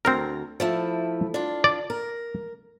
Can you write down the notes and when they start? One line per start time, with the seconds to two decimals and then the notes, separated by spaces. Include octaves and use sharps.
0.05 D2 C4 A#4 A#5
0.60 F3 A3 E4
1.34 D4 F4
1.64 D5
1.90 A#4